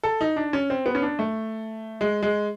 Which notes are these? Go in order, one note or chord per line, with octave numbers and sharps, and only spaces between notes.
A4
D#4
D4
C#4
C4
B3
C#4
D4
A3
G#3
G#3